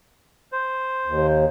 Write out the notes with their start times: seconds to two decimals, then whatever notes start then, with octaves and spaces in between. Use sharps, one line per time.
0.52 C5
1.06 D#2